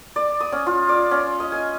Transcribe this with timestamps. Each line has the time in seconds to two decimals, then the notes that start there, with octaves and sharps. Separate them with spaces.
0.16 D5
0.40 D#6
0.52 C#4
0.67 F4
0.89 D5
1.11 C#4
1.40 D#5
1.52 G#5